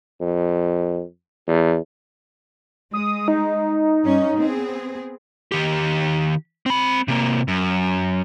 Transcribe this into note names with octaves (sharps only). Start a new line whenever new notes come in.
F2
E2
G#3 D#6
D#4
G2 C#4
B3 C4 G#4
D#3 G4
C4 B5
C3 A#3
F#2